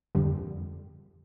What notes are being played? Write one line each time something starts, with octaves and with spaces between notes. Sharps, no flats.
F2 D3 G3